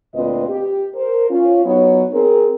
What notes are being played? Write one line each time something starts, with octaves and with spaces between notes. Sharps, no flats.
D2 A#2 C4 F4 B4 D#5
G4
A#4 C5
C#4 F4
F#3 B3 D#4 C#5
C4 G#4 A#4